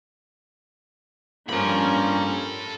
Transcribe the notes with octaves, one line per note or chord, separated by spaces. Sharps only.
G2 F3 A#3 C#4 A4 B5